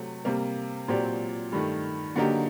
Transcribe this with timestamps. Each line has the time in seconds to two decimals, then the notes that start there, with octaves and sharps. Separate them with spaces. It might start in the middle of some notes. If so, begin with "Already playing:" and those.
Already playing: C3 F#3 A3 C4
0.25 C3 G3 A#3
0.88 A#2 F#3 C4 G4 D5
1.52 G2 D#3 A3
2.16 D3 F#3 A#3 D#4 G4